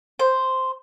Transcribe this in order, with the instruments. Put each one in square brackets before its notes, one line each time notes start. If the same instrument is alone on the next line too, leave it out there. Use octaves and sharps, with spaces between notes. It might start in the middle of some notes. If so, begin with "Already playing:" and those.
[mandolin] C5